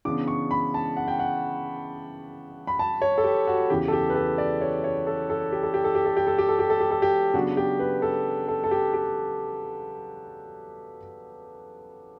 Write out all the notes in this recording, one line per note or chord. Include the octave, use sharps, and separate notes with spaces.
C#3 E3 B3 D4 D6
C#6
B5
A5
F#5
G5
F#5
B5
A5
C#5
A4
G4
F#4
E2 C#3 E3 G4
A4
G4
B4
A4
D5
C#5
C#5
A4
A4
G4
A4
G4
A4
G4
A4
G4
A4
G4
A4
G4
A4
G4
A4
G4
C#3 F#3 B3 D4 F#4
G4
B4
A4
A4
A4
G4
G4